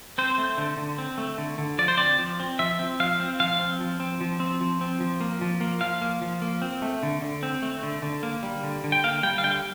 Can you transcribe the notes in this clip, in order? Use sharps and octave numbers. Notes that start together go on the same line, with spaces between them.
C4 C5
A3
D3
D3
C4
A3
D3
D3
F3 D5
C5
C4 D5
F3
C4
F3 E5
C4
F3 F5
C4
F3 F5
C4
F3
C4
F3
C4
F3
C4
F3
A#3
F3
A#3
F3 F5
A#3
F3
A#3
C4
A3
D3
D3
C4
A3
D3
D3
A#3
G3
D3
D3
G5
A#3 F5
G3 G5
F5
D3 G5